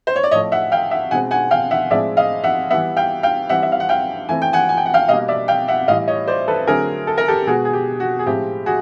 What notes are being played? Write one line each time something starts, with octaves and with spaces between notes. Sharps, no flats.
C5
C#5
D5
A2 F3 A3 C#5 D#5
E5 F#5
F5 G5
E5 F#5
B2 G#3 C4 F#5 G#5
F#5 G#5
F5 G5
E5 F#5
A2 F3 G#3 C4 D5 E5
D#5 F5
E5 F#5
E3 G3 B3 E5 F#5
F5 G5
F5 G5
E3 G3 C4 E5 F#5
E5
F5
F#5
F5 G5
E3 A3 C4 G#5
G5
F#5 G#5
G#5
G5
F#5
F5 G5
B2 G3 A#3 D#5 F5
D5 E5
F5 G5
E5 F#5
A2 E3 G3 D#5 F5
C#5 D#5
C5 D5
A4 B4
D3 F#3 A3 C4 G#4 A#4
A4
A#4
G4 A4
B2 G#3 B3 F#4 G#4
G#4
G4
F#4
G#4
A2 F3 G#3 C4 G4
F#4 G#4